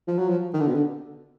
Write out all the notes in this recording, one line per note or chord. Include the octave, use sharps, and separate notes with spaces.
F3
F#3
F3
D#3
D3
B2
D3